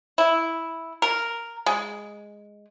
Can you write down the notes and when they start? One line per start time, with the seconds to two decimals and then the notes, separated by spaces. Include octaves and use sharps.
0.18 E4
1.02 A#4
1.66 G#3